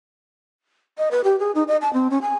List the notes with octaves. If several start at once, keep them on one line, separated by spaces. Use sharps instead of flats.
D#5
B4
G4
G#4
D#4
D#5
A5
C4
C#4
G#5